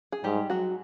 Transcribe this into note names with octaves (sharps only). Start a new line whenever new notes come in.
G#4
G#2 G3 G4
F#3 F#4